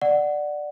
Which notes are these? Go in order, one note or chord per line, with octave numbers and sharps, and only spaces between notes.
D5 F#5